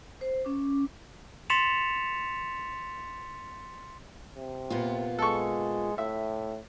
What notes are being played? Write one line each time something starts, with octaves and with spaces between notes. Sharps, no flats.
C5
C#4 D6
C6 A6 B6 C#7 E7 F7
C3
A#2 B3 F4
G#3 A4 C#6
A2 E5